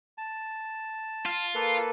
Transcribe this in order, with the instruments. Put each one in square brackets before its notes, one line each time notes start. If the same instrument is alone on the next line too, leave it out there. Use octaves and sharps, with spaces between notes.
[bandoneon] A5
[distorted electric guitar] F4
[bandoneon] A#3 A4 B4